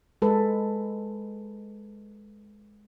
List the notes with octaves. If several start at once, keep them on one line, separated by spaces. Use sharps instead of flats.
G#3 A4 B4